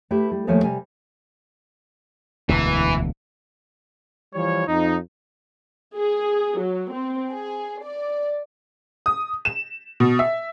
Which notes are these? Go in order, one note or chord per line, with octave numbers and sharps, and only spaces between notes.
A3 E4 G4 B4
G3
D#2 F3 A3 A#3 C#5 G#5
C3 G3 G#5
E1 D2 E3
E3 F3 G3 C#5
F2 D#4
G#4
F#3
C4
G#4
D5
D#6
E7
B2
E5